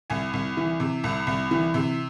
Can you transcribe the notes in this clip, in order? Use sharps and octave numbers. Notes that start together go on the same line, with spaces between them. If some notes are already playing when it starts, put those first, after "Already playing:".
C2 G#5
C2
E3
C3
C2
C2
E3
C3